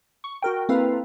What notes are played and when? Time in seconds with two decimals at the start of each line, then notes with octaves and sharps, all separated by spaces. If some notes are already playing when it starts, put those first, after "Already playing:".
0.24 C#6
0.42 F#4 A#4 G5
0.69 A#3 C4 E4 A4 B4 F5